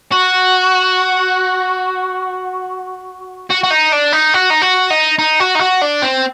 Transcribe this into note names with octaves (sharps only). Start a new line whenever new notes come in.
F#4
F#4
F#4
D#4
D4
D#4
F#4
D#4
F#4
D#4
D#4
F#4
D#4
F#4
D4
C4